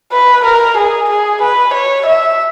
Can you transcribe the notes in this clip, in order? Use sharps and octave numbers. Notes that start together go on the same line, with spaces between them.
B4
A#4
G#4
G#4
B4
C#5
E5